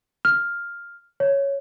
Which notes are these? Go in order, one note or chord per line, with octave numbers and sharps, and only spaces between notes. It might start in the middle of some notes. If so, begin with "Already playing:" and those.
F6
C#5